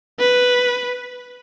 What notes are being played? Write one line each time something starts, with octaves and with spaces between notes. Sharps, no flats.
B4